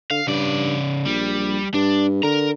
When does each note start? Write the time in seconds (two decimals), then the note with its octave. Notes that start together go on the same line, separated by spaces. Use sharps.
0.11 D3 F5
0.27 G2 C#3 D5
1.05 A#1 G3
1.74 G2 D4
2.23 D3 A#4 A#5